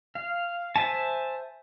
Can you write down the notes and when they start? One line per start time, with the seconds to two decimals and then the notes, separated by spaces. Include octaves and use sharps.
0.15 F5
0.76 C5 E5 G#5 A5